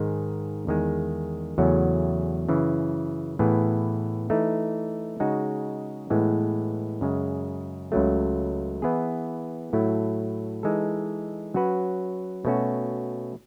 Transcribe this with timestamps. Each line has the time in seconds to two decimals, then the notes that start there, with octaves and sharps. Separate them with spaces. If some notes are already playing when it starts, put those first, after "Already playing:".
Already playing: G#2 D#3 G#3
0.67 E2 D#3 G#3
1.58 E2 C#3 F#3 A3 C#4
2.49 F#2 C#3 E3
3.39 A2 E3 B3 E4 G#4
4.30 E3 A3 D#4
5.20 C#3 G#3 D#4 F#4
6.10 A2 E3 G#3 B3
7.01 F#2 C#3 G#3
7.92 C#2 C#3 F#3 A3
8.82 E3 B3 E4 G#4
9.73 A2 F#3 A3 E4
10.63 E3 G#3 D#4 A4
11.54 F#3 C#4 F#4 B4
12.45 B2 A3 C#4 F#4